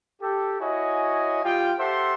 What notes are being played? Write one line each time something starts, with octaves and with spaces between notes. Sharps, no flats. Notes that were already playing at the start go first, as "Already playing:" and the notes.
G4 A4
E4 F#4 C#5 D#5 G#5
G3 F4 G5
G4 A4 C5 E5 F#5 C6